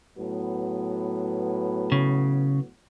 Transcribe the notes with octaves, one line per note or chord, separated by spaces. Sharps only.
A2 F#3 B3
C#3